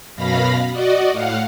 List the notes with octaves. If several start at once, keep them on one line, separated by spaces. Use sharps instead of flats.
F#2 B2 F5 B5 A#6
F#4 D5 D#5
A2 F5 F#5